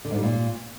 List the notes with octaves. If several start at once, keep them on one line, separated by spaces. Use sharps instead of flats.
D3
G#2
G3
A#2